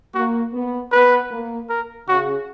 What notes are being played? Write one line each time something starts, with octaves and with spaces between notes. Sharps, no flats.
A#3 F#4
B3
B3 B4
A#3
A#4
C#3 F#4